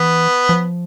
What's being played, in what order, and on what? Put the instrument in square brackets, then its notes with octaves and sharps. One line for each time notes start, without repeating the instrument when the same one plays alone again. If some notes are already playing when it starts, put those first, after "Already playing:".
Already playing: [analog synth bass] E3 [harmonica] B3
[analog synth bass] F3